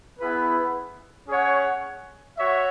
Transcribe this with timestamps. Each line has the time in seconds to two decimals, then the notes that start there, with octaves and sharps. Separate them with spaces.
0.20 B3 E4 G#4 B4
1.28 C#4 G#4 C#5 F#5
2.37 F#4 C#5 E5